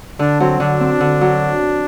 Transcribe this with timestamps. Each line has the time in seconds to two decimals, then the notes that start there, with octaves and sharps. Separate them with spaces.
0.19 D3 D4
0.40 F#3 C4
0.60 D3 D4
0.81 C4
1.00 D3
1.21 F#3